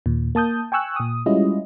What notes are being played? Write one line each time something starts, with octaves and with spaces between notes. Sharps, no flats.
D#2 A#2
A#3 A5 D#6 G6
G5 G#5 C#6 E6 F#6
A#2 D#6
G3 G#3 C#4 E4 F4 D#5